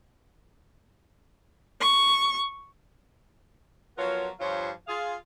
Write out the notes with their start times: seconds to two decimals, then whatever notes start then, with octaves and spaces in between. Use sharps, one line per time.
1.81 C#6
3.97 F3 F#3 B3 F4 A#4 C#5
4.39 G2 F3 F4 C5 C#5
4.87 F4 G#4 F5